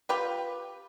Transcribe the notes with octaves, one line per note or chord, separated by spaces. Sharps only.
F4 G4 B4